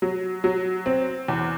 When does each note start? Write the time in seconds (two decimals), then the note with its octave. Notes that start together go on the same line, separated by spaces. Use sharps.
0.02 F#3
0.44 F#3
0.86 C4
1.28 E2